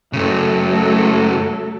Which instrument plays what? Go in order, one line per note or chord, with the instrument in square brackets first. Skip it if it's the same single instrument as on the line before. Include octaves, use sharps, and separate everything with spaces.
[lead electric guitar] F#2 C#3 [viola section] F#3 A3 A4